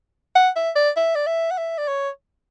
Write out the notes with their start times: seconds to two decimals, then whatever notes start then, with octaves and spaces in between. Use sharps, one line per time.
0.35 F#5
0.56 E5
0.76 D5
0.97 E5
1.15 D5
1.26 E5
1.51 F#5
1.58 E5
1.78 D5
1.88 C#5